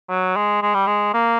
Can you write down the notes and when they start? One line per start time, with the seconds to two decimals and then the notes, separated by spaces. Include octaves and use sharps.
0.09 F#3
0.36 G#3
0.62 G#3
0.74 G3
0.87 G#3
1.14 A#3